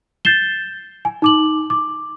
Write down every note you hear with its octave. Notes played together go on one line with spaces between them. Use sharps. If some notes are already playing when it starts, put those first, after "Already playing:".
G6 A6 C7 E7 G7
G#5
D#4 D6 F#7
D6